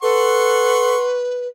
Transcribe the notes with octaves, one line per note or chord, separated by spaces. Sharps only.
A4 B4 F#5 C6 C#6